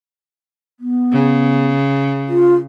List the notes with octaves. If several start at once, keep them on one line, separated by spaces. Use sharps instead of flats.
B3
C#3
F4